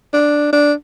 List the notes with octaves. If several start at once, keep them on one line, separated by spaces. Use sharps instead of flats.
D4
D4